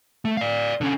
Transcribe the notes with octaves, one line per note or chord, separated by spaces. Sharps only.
A3
D5 F5
D3 C#4